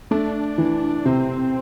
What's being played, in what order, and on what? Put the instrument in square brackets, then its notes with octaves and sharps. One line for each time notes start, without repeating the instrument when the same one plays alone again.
[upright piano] A3 [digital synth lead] D4
[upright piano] E3
[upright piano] C3 [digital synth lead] C4